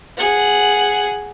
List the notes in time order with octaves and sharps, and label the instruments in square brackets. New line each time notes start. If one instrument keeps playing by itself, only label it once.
[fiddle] G#4 F#5